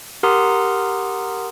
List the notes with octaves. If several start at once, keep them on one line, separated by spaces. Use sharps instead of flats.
G4 A#4 F#5 A#5 C6 D#6